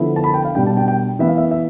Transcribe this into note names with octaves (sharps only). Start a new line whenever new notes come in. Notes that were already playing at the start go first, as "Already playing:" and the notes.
Already playing: D3 F3 B3 E4
A5
B5
G5
F5
B2 G3 D4 G5
A5
G5
G5
E3 B3 E4 E5
F5
E5
E5